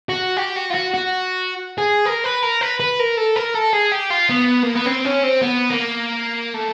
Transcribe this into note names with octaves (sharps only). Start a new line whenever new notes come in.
F#4
G4
F#4
F4
F#4
F#4
G#4
A#4
B4
A#4
B4
B4
A#4
A4
A#4
A4
G#4
G4
F4
B3
A#3
B3
C4
C#4
C4
B3
A#3
A3